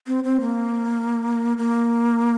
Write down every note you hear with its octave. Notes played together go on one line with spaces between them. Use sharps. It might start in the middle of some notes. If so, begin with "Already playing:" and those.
C4
C4
A#3
A#3